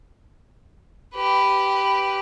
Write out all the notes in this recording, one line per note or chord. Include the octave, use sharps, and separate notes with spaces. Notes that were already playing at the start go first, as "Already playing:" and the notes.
G4 B4